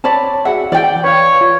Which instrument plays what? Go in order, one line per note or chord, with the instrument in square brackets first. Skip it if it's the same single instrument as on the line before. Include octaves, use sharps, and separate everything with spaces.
[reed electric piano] C4 C#5 B5 [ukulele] D5 A5
[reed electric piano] F#4 G#4 E5 [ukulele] F#5
[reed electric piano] E3 G6 [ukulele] D5 G5
[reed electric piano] B4 F5 [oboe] C#5
[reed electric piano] F4